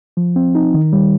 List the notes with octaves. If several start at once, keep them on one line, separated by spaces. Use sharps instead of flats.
F3
C4
D#4
D#3
G3